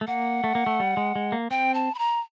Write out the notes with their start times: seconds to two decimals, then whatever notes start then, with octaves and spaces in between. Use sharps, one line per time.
0.01 A3
0.07 A#3 F#5
0.44 A3
0.55 A#3
0.66 A3
0.80 G3
0.97 G#3
1.16 G#3
1.32 A#3
1.51 C4 G5
1.74 A5
1.95 B5
1.99 A#5